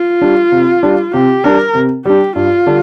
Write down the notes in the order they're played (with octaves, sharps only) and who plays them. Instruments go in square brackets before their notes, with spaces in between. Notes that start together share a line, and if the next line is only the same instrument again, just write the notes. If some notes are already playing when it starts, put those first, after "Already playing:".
Already playing: [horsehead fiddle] F4
[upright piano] G3 D4
C3
G3 D4
[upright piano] C3 [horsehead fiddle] G4
[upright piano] G3 D4 [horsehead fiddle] A#4
[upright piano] C3
[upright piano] G3 D4 [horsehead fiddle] G4
[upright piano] G2 [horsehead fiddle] F4
[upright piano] D3 G3 D4